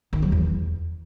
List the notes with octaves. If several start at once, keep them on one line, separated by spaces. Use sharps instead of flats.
D#3
F#3
E2